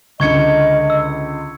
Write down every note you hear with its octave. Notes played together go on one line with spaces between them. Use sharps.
C#2 D3 D#5 C#6 G#6 C#7
E6